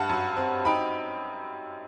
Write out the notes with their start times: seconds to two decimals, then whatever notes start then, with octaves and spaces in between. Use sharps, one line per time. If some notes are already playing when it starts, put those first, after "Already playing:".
Already playing: G2 F#5 A5
0.09 F#2
0.37 C4
0.65 D#4 G5 B5